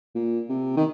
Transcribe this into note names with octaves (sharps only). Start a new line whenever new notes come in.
A#2
C3
D#3